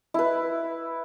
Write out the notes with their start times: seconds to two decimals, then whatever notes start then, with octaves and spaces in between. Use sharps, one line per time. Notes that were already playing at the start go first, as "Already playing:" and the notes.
0.14 E4 B4